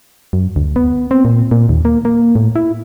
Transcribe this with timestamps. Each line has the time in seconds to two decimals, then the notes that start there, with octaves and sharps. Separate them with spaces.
0.33 F#2
0.56 D2
0.76 B3
1.11 C4
1.25 A#2
1.51 A#2
1.69 D#2
1.85 A#3
2.05 A#3
2.36 A2
2.56 E4